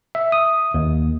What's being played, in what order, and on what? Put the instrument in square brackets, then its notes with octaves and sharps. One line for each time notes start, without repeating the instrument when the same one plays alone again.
[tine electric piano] E5
D#6
D#2